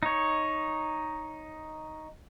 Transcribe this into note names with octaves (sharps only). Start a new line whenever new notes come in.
D#4 C#5